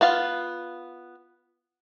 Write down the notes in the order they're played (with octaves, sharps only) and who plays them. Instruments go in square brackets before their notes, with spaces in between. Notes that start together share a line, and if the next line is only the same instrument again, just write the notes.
[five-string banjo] B3 F4 F5